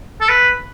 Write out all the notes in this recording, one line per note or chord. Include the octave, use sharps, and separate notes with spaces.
A4
B4